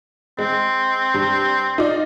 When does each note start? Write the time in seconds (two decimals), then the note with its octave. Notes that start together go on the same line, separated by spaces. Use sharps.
0.39 G#3 C4
1.14 G2
1.78 D#4 F4 D5